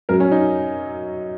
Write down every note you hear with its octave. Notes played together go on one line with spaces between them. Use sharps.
F#2 F#3 A#4
C#4
D#4